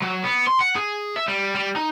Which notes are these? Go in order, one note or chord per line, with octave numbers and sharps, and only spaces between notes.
F#3
B3
C6
F#5
G#4
E5
G3
G3
D#4